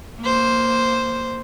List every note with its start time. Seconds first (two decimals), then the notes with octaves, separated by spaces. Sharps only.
0.21 A#3 C5